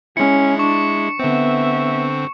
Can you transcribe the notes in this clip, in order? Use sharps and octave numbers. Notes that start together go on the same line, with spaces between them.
G#3 C#4 E4 C#7
D4 C#6
D3 B3 C4 E5